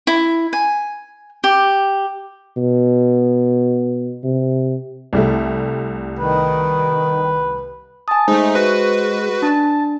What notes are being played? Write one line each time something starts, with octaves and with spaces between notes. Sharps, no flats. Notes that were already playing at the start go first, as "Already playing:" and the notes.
E4
G#5
G4
B2
C3
C2 G3 A3
D#3 B4
G#5 A5 D#6
G#3 A3 D#4 C5
F#4 B4
D4 A5